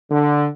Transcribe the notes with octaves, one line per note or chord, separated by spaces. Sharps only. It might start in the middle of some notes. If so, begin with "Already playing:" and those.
D3